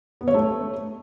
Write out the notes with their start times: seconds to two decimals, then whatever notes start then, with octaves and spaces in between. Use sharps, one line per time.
0.21 B3
0.28 C#5
0.34 A3